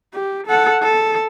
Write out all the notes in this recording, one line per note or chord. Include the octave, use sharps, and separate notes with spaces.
G4
A4 F#5
A4